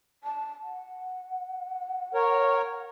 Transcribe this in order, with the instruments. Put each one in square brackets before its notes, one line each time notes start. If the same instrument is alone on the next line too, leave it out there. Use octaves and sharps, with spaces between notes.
[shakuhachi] A5
F#5
[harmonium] A#4 C#5